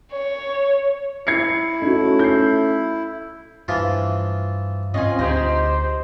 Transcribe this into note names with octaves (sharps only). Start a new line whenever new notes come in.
C#5
E4 G#6 C7 C#7
A3 C#4 D#4 F#4
G6 C7
G2 E3 F3 F4
G#2 C4 F4 D#5 G#5
D2 D#4 G4 G#4 C5 D#5